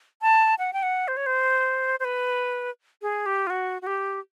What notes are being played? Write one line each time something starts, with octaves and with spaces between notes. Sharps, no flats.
A5
F#5
G5
F#5
C5
C#5
C5
C5
B4
G#4
G4
F4
F#4
F#4
G4